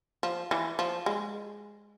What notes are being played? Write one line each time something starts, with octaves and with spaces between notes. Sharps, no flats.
F3
E3
F3
G#3